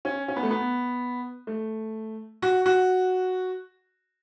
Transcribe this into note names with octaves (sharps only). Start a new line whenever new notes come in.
C#4
C#4
B3
A3
B3
A3
F#4
F#4